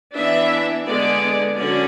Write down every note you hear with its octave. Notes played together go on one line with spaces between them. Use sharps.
E3 B3 D4 E5
D3 G#3 B3 D4 D5
D3 F#3 C#4 D5